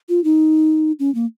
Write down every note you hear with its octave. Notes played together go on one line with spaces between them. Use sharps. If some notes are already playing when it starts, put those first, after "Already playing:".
F4
D#4
C#4
A#3